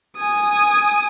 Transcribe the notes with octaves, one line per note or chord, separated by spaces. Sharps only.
G#5 D#6